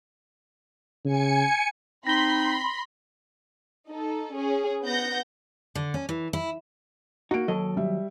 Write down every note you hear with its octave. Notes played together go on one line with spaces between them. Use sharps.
C#3 G#5 C#7
C4 D#4 B5 C6 A#6 G7
D#4 A4
C#4 G#4
B3 F#5 G6 A#6
D3
C#4
E3
E4
A#3 D#4 F#4 D7
D#2 F#3 A4 D#5
G3 E5